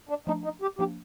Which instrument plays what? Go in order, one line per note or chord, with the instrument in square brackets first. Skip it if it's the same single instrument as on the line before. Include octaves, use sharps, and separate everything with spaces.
[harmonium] D4
[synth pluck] F3 A3 D4 [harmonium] D#4
[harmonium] D#4
G4
[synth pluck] F3 A#3 D4 [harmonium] G4